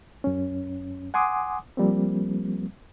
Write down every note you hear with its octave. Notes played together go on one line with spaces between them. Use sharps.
F#2 C#4
F#5 G#5 C6 D6 D#6
F3 G3 A#3 C4